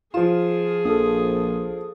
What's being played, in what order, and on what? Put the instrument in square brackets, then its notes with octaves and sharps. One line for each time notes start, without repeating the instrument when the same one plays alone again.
[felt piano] F3 F4 [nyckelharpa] G#4 [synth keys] E7
[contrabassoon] A#1 [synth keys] A4 D#6